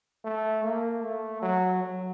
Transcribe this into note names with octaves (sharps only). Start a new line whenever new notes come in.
A3
A#3
A3
F#3
F#3